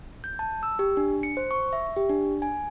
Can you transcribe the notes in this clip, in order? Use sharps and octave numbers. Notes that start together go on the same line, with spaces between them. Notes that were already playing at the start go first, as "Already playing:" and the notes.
G6
A5
E6
G4
D4
C#7
C5
C#6
E5
G4
D4
G#5